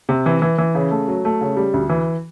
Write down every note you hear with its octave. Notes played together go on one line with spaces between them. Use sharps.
C3
E3
E3
E3
C#3
A3
F#3
A3
C#3
G3
D2
E3